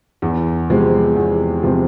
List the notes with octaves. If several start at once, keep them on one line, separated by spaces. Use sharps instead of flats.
E2
C3 F3 G#3 C4
E2
C3 F3 G#3 C4